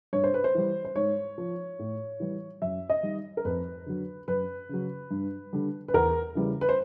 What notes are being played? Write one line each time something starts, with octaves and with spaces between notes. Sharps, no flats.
G2 C#5
C5
B4
C5
E3 G3
C5
G#2 C#5
F3
A2
E3 G3
F#2 E5
D#5
D#3 G3
A#4
F2 B4
D3 F#3
F#2 B4
C#3 F#3
G2
D3 G3
B4
E2 A#4
C#3 E3 G3
B4
C5